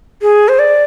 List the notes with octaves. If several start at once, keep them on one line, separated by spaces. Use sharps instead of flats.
G#4
C5
D5